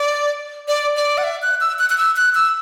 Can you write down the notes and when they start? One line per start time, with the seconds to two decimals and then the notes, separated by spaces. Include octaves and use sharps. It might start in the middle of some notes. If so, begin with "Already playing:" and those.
Already playing: D5
0.68 D5
0.96 D5
1.18 F#5
1.24 E5
1.42 F#6
1.61 E6
1.79 F#6
1.90 F#6
1.98 E6
2.16 F#6
2.35 E6